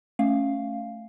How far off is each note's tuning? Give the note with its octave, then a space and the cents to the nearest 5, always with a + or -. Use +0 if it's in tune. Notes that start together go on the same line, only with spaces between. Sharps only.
A3 +0 C#4 -5 F5 +0